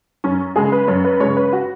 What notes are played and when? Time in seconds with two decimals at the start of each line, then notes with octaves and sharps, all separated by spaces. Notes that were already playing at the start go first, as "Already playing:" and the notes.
0.24 F#2 C#4
0.56 C#3 G#3 G#4
0.72 B4
0.88 F#2 C#5
1.04 B4
1.20 C#3 G#3 C#5
1.37 B4
1.53 F#4